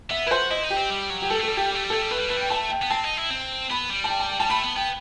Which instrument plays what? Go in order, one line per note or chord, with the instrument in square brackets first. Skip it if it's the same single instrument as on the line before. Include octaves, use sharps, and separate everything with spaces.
[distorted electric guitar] B3 [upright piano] E5
[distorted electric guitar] E4 [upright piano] B4
[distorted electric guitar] F#4 [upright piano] C5
[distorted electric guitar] E4 [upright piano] D#5
[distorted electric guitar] D#4
[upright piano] G4
[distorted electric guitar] C4
G3
F#3
[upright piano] G4
[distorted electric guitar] G3 [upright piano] A4
[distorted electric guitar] A3
[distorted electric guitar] G3 [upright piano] A4
[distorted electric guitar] A3 [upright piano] G4
[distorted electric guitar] G3
[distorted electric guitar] A3 [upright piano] G4
[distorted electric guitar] G3
[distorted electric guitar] A3 [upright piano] A4
[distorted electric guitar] G3
[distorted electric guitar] A3 [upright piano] B4
[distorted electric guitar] G3
[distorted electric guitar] A3 [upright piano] B4
[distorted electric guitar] G3 [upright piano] G5
[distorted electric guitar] A3 [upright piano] A5
[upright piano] G5
[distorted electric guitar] B3
[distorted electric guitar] C4 [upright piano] A5
[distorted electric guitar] D#4
E4
C4
[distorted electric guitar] B3 [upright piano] B5
[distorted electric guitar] G3
[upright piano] A5
G5
A5
G5
[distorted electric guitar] G3 [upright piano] A5
[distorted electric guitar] A3 [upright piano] B5
[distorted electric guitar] B3
[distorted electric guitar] B3 [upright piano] G5